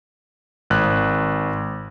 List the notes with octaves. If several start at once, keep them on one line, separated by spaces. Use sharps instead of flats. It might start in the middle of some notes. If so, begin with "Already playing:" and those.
G#1 F#6